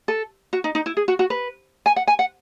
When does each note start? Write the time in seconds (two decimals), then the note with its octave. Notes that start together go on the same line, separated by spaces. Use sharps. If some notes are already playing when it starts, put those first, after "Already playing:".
0.08 A4
0.53 F#4
0.64 D#4
0.75 D#4
0.86 E4
0.97 G#4
1.08 F#4
1.19 F#4
1.30 B4
1.86 G#5
1.96 F#5
2.07 G#5
2.19 F#5